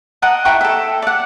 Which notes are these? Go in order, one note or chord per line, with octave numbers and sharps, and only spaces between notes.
A#4 D#5 F#5 A5
E4 G5 A#5 C#6
A4 E5
D5 F#5